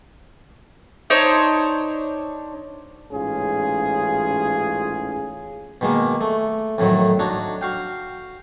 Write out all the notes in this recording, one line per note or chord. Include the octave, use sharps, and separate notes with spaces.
D4 D#4 C5 C#5
A1 G#2 C#4 F4 G#4
B2 D#3 G#3 A#3
A3
F2 A2 D#3 F#3
D4 D#4 F#4 C#5
F#4 F5 G5